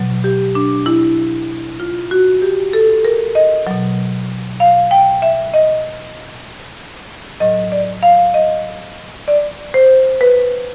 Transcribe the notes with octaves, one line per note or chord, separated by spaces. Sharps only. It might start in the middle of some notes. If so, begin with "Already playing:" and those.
Already playing: B2 F#3
G4
D4
E4
F4
F#4
G4
A4
A#4
D#5
B2 F#3
F5
G5
E5
D#5
A2 F#3 D#5
D5
F5
D#5
D5
C5
B4